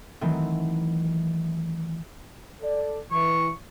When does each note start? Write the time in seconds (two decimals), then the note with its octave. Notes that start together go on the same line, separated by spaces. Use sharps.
0.21 D#3 E3 F#3 A3 C4
2.62 A4 D5
3.11 E3 C#6